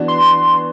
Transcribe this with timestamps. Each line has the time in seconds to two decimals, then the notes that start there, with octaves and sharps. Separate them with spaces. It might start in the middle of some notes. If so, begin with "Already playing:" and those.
Already playing: E3 B3 D4 F#4
0.08 C6